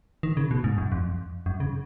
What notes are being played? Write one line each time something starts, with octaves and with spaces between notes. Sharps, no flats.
D#3
C#3
B2
G#2
F#2
F2
F#2
C#3